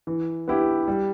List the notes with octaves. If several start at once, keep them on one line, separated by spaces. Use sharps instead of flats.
E3
B3 E4 G4
G3